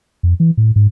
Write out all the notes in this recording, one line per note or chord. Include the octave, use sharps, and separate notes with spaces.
F2
E3
A2
G#2